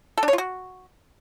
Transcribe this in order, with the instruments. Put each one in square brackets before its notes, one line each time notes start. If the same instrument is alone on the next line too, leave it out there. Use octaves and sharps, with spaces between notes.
[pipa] A4
D4
C#5
F4
F#4